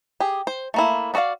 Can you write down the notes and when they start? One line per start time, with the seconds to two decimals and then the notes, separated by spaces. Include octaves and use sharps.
0.20 G4 G#4
0.47 C5
0.74 A3 A#3 E4
1.14 B3 F#4 A4 D5 F5